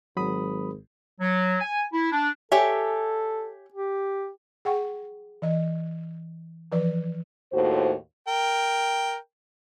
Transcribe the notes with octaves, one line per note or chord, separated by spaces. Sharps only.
G#1 F#3 B5 D#6
F#3
G#5
E4
D4
G4 A4 C#5 E5 G#5
G4
G#4 F#5 G5 C#6
E3 D#5
E3 F3 B4 D5
D#2 A2 F#4 C5
A#4 G5